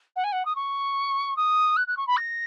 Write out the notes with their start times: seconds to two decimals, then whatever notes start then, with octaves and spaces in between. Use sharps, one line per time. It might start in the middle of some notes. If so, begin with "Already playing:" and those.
0.16 F#5
0.23 G#5
0.32 F#5
0.45 D#6
0.55 C#6
1.36 D#6
1.76 F#6
1.87 F#6
1.96 C#6
2.07 B5
2.16 A#6